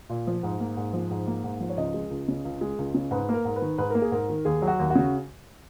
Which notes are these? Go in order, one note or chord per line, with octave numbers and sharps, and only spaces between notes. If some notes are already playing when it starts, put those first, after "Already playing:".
A#2
F3
G#2
A#3
G#2
F3
G#2
A#3
G#2
F3
C#5
C#2 D#5
G#3
C#2
C#3
C#2
G#3
C#2
C#3
G#2 B4
A#3 A#4
G#2
B4
D#3
G#2 B4
A#3 A#4
G#4
G#2 A#4
D#3
D#2 G#4
F#3
F#4
D#2
F#4
C#3